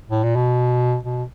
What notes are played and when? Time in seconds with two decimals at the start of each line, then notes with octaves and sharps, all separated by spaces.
0.10 A2
0.23 A#2
0.36 B2
1.03 B2